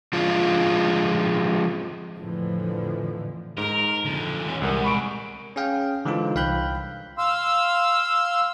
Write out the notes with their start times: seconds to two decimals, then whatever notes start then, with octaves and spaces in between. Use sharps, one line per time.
0.13 F3 G#3 C4 D4 F4
2.18 F2 A2 D3 E3 F3
3.58 G#2 A#4
4.05 F2 D3
4.44 E3 C#4
4.62 C2 G#3 A#4 F#5
4.84 B5 C#6 D7
5.56 C#4 G#4 F5 G5
6.05 D3 E3 G#3 D#4 F4 C5
6.35 C2 F5 G5 B5 F#6 G6
7.18 F5 C6 E6